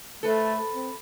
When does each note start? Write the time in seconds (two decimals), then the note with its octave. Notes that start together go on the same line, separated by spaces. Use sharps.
0.23 A3 A4 B4 C5
0.74 C4